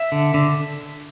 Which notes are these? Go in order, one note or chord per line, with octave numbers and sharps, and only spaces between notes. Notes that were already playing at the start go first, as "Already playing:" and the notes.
Already playing: E5
D3
D3